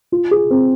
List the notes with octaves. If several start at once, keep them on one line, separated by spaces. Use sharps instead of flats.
F4
G#4
C4